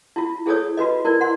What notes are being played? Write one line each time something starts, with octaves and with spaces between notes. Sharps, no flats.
E4 F4
E4 G#4 A4 C5 C#5 D#6
F4 F#4 B4 D#5
E4 A#4 D5
F#5 C6